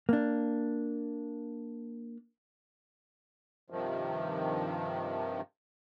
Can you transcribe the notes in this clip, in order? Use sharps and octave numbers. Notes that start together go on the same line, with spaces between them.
A#3 D4
G2 C3 D#3 F3